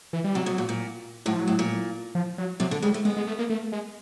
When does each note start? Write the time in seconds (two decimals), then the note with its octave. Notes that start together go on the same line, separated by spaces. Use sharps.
0.13 E3
0.24 G3
0.35 C3 F#3
0.46 B2
0.58 A#2
0.69 A#2
1.26 A2 F#3
1.33 F3
1.40 F#3
1.48 A2
1.59 A#2
2.15 F3
2.38 F#3
2.60 C3 F#3
2.71 D3
2.82 G3 G#3
2.94 A3
3.05 G#3 B3
3.17 G#3
3.27 A3
3.39 A#3
3.50 A3
3.72 G#3